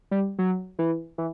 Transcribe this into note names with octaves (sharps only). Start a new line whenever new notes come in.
G3
F#3
E3
E3